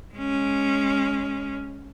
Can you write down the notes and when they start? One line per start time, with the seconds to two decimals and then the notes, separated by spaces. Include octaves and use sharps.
0.14 G#3 C#4